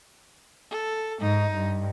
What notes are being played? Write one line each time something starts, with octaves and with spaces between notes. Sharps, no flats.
A4
G#2 D#4
G2